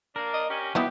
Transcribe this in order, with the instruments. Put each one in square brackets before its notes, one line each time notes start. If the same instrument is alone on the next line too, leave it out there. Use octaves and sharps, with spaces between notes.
[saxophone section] A#3 D4 [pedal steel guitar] A#4
[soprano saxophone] D#5
[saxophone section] C#4 [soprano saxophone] G4
[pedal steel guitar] F#3 G3 D#4 [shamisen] B3 E4 F#4 [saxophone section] G4 [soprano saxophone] B4